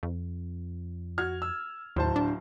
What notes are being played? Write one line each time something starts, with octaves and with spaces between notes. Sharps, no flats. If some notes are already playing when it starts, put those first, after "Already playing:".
F2
F#4 F6 G#6
E6
D1 D#2 C5 A5
D4